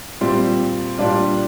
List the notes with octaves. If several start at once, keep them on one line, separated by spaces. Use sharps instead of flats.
A#2 G3 C4
A#2 G3 D4 F4